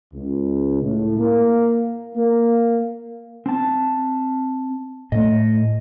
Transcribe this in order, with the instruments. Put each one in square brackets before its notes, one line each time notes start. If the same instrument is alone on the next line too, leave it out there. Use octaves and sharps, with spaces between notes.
[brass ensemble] C#2
A2
A#3
A#3
[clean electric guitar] C4 A5
[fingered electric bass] A2 A3 [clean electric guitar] D#5